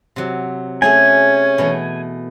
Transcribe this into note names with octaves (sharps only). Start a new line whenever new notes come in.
C3 F#3
A3 C#4 G#4 E5 G#5
B2 E3 A3